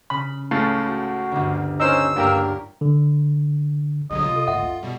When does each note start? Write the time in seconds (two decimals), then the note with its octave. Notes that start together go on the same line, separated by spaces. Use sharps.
0.10 C#3 B5
0.51 C#2 A2 C#3 A6
0.87 F#4
1.32 G1 D2
1.80 C#4 D#4 A#4 C5 E6
2.16 C#2 G2 A#3 D4 G4 A#4
2.81 D3
4.11 A#1 D3 F#3 G3 D#5
4.24 C3 F4
4.36 A4
4.47 D2 G#2 E5 F#5
4.63 F#2
4.83 B2 G3